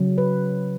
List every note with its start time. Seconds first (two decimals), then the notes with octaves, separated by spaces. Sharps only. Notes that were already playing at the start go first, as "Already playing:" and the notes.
Already playing: C#3 F#3
0.18 B4